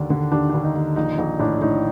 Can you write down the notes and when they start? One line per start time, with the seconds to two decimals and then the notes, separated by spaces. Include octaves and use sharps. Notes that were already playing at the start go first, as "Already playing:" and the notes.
Already playing: D#2 D3 D4
0.10 D3
0.32 D#2 D4
0.50 D#2 D4
0.64 D#4
0.76 D#2
0.96 A#1 D#4
1.18 A#1 D#4
1.39 A2 D4
1.61 A2 D#4